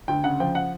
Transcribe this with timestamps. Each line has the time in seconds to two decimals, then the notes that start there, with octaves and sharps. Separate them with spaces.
0.08 D2 G5
0.24 C#3 F#5
0.40 F3 G5
0.55 F#5